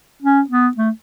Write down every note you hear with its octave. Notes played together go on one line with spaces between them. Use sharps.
C#4
B3
A3